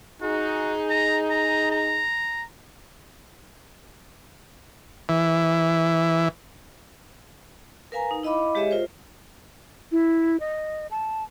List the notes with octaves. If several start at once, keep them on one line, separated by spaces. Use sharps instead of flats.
D#4 F#4 G#4
A#5
A#5
A#5
E3
A#4 B4 F5 G#5 A#5
D#4
E4 D#5 F5 B5 D6
G#3 G4 G#4 C#5 D#5 E5
F4 A#4 C5
E4
D#5
A5